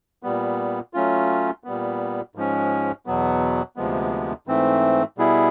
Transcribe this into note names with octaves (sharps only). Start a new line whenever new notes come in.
A#2 G3 B3
F#3 A3 C#4 F4
A#2 G3 B3
G#2 F3 G#3 C#4
E2 B2 F#3 B3
D2 C3 F3 G#3 B3
G#2 E3 A3 C4
B2 G3 B3 E4 G#4